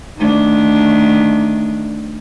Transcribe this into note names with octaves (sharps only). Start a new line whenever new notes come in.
D#3 A3 D4